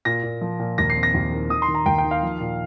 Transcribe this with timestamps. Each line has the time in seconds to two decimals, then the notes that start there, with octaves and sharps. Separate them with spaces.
0.05 A#2 A#6
0.23 A#2
0.41 F3
0.59 A#2
0.78 D#2 A#6
0.90 C7
0.96 C4
1.03 A#6
1.14 D#2
1.32 D#3
1.50 D#3 D#6
1.62 C6
1.68 D#3
1.75 A#5
1.86 D#2 G5
1.98 G5
2.04 D#3
2.11 F5
2.23 F3
2.40 A#2